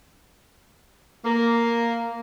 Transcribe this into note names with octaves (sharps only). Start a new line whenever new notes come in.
A#3